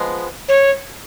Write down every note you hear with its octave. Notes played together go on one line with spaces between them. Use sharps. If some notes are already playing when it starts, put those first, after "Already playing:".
Already playing: F3 G#3 B3
C#5